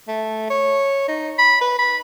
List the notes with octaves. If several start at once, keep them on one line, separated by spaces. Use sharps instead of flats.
A3
C#5
D#4
B5
B4
B5